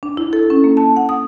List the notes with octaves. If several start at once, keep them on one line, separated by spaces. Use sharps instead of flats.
D4
E4
A4
C#4
A#3
A5
F#5
D#6